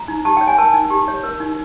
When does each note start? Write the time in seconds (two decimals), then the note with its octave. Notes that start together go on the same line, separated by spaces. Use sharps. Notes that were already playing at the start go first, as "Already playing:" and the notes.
Already playing: A#5
0.08 D#4
0.25 G4 A5
0.37 C#5 G5
0.47 G#5
0.58 A#4 A5
0.74 D#4
0.90 G4
1.08 C#5
1.23 A#4
1.40 D#4